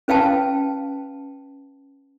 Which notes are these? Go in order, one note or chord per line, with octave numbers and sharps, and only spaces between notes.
C#4 B4 F5 G5 A5